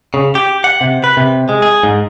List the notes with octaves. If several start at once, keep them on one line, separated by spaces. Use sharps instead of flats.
C#3
G4
F#5
C3
B4
C3
G#3
G#4
G#2